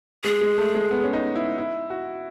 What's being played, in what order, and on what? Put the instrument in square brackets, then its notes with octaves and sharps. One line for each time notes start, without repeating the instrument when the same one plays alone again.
[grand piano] G#3 [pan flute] G#4
[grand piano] G#3
A3
G#3
B3
C#4
D#4
E4
E4
F#4